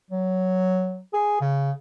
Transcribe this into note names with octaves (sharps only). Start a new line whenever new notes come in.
F#3
G#4
C#3